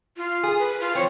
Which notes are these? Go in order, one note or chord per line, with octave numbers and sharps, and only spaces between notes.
F4
G#4
B4
F4
F3 C4 C#5